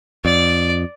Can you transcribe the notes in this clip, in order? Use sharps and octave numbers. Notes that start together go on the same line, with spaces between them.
F2 D5